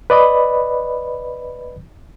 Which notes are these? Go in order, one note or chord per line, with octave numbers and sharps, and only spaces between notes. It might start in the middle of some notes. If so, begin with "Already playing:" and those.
B4 D5 D#5 B5